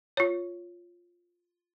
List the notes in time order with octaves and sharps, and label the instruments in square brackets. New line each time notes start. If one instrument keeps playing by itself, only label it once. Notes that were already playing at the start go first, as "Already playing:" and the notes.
[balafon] F4 C#5